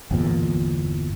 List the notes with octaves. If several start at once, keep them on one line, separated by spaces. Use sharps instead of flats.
G1 E2 A#2